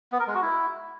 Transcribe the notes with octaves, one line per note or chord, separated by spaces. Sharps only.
B3
A#4
G#3
F#4
E4